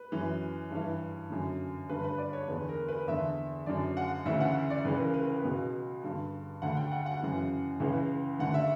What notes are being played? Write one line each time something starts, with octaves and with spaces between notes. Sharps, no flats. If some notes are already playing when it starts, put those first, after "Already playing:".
Already playing: B4
F#2 E3
G2 E3
F#2 D3
G2 D3 B4
B4
D5
C#5
E2 D3 B4
A#4
B4
E2 D3 E5
F#2 D3 D5
F#5
D2 C#3 E3 E5
F#5
D5
C#2 C#3 E3 B4
A#4
B4
B4
C#2 B2
G2 D3
D2 D3 F#5
G5
F#5
F#5
F#2 C#3 E3
C#2 C#3 E3
D2 D3 F#5
E5